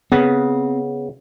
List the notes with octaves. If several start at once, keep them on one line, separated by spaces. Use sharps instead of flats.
C#3 B3 C4